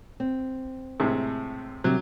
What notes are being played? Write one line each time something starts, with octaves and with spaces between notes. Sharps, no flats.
C4
A2 C3 G#3
C3 F#3 G3